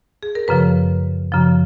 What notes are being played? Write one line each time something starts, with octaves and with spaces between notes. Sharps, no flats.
G#4
A#4
F#2 C#3 F3 B4
F#2 C#3 F3